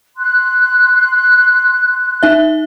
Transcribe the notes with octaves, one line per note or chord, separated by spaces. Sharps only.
C6 F#6
D#4 E5